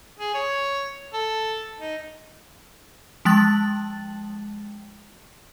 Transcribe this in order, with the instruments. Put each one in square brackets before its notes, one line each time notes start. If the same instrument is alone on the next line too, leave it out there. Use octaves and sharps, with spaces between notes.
[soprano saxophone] G#4
C#5
A4
D#4
[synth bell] F3 G#3 G5 A5 A6 F#7